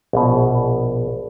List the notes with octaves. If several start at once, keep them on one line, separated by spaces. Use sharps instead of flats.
A#1 B2